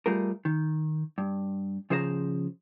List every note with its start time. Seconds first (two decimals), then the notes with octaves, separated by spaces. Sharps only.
0.06 G3 A3 F4 G#4 A#4
0.45 D#3
1.18 G2
1.90 C#3 F3 G#4 C5 C#5 A#5